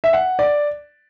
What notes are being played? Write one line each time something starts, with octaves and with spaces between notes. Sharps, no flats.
E5
F#5
D5